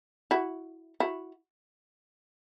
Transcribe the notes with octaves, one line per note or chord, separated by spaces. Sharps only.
E4 F#4
E4 F#4